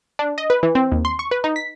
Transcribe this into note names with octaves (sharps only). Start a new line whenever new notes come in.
D4
D#5
B4
E3
C4
D#2
C6
C#6
B4
D#4
B6